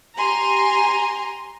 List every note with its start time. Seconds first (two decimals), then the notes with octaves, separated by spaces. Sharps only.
0.17 G4 G#5 A#5 C6